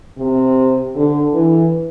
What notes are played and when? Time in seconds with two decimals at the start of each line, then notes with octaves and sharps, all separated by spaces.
0.18 C3
0.96 D3
1.34 E3